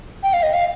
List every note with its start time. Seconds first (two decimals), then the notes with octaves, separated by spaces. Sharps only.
0.23 G5
0.33 F5
0.43 D#5
0.53 F5